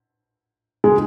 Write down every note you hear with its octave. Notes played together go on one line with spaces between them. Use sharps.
G#3